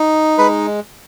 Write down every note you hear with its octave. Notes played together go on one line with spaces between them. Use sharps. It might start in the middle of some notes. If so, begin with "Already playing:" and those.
Already playing: D#4
G#3 B4 B5